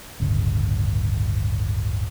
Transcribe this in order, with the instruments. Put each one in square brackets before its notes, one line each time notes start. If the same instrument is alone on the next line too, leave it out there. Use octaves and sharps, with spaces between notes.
[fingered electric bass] D1 G1 C#3